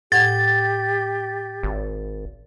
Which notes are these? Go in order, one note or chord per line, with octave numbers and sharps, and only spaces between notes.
A2 G4 F#5 G#6 A6
G#1